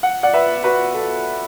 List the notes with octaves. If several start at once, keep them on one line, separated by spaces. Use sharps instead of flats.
F#5
D5 F#5
B4 E5
F#4 B4
A4